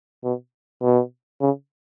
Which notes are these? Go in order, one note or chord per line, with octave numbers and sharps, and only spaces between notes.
B2
B2
C#3